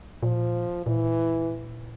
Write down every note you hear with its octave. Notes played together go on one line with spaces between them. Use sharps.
A#2 F3
A#2 E3